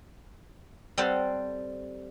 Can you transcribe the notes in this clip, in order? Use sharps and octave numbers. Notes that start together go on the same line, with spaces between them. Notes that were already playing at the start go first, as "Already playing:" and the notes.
G3 C4 A4 C5 F#5